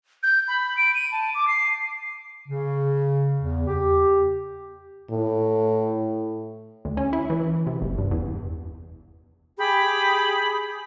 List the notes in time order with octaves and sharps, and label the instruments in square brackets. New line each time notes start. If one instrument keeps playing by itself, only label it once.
[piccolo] G6
B5
D7
D#7
A5
D6
C7
[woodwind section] C#3
E2
G4
[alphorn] A2
[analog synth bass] D2
C#4
E4
E3
C3
F#1
G2
E2
[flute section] G4 G#4 B5